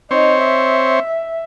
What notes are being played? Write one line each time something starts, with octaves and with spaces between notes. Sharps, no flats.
C4 D#4 C5 C#5
E5